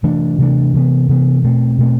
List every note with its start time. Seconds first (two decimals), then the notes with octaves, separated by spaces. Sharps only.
0.03 C3 E3 A3 D4
0.38 C3 E3 A3 D4
0.74 C3 E3 B3
1.08 C3 E3 B3
1.44 B2 A3 C4
1.78 B2 A3 C4